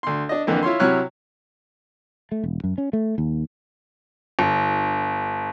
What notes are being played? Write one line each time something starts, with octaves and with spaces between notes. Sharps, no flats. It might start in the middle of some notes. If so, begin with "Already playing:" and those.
D2 C6
D4 D#5
F2 D3 E3 A#3
E4 F4 C#5 C6
C3 F#3 E4 C#5 F6 F#6
A3
E1
F#2
C#4
A3
D#2
G1